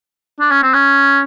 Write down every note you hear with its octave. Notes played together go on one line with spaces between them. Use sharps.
D4
C#4
C4
C#4